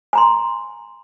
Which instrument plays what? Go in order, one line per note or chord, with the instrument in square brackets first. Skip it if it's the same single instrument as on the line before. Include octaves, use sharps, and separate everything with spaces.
[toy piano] G#5 A#5 C6